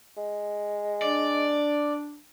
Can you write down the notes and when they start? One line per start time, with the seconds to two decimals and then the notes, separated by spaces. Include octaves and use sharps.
0.17 G#3
1.02 D4 D5